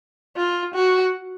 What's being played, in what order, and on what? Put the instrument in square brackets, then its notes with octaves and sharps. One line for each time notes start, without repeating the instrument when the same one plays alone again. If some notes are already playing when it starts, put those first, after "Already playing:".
[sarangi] F4
F#4